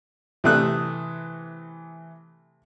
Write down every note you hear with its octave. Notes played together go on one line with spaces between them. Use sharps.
C3 E3 A3 D#6 F#6